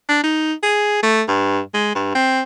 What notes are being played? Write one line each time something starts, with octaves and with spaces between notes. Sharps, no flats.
D4
D#4
G#4
A3
G2
G#3
G2
C4